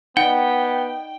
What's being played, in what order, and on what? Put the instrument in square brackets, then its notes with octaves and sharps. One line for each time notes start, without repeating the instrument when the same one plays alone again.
[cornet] B3 [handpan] D#4 D5 [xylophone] F#5 [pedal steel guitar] G5